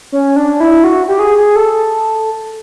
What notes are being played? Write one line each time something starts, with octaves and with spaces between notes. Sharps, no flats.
C#4
D4
E4
F#4
G4
G#4
G#4
A4